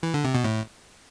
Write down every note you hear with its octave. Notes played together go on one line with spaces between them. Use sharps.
E3
D3
C3
B2
A2